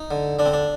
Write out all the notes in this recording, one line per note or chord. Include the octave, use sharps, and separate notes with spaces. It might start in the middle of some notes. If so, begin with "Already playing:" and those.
Already playing: D#4
D3
D3 D4
C4
D4